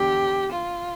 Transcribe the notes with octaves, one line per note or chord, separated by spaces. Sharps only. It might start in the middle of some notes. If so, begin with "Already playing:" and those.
Already playing: E2 D3 G4
F4